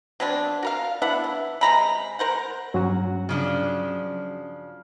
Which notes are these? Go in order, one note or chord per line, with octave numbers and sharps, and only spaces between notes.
F#3 B3 C4 D4
F#4 A#4 F5
B3 D4 E4 F#5
E3
C3 G#3 A#5 B5
A#4 C5 F#5
G2 F#3 C#4 F#4
C#3 F3 D4